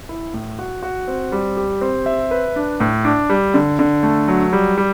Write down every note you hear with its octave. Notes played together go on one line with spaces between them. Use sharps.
E4
A2
F#4
F#4
C4
G3
G4
C4
E5
B4
D4
A2
D4
G3
D3
D3
A3
F#3
G3
G3